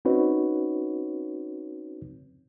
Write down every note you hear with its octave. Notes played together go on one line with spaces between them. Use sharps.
C4 C#4 D#4 F#4 B4 C#5